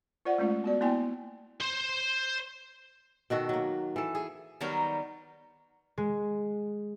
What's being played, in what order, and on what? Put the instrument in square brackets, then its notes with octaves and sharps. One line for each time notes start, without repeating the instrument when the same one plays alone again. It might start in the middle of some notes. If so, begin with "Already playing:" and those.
[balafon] F4 C5 D5 F#5
G#3 A3 C#4 F4
B3 F#4 D5
A#3 B3 E4 G5 G#5
[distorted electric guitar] C5 C6
[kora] B2 D#3 F#4 A4
F#3 A#3
E3 A4
G#4
[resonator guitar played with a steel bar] D#3 F#3 G3 B3 D#4 A#4
[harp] G#3